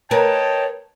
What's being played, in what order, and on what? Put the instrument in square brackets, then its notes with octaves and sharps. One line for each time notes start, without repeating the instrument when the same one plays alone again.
[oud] A#4 B4 [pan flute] C#5 [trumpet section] D#5 G5 A5